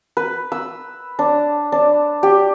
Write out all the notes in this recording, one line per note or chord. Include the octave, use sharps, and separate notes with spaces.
B4
E6
D4
D4
G4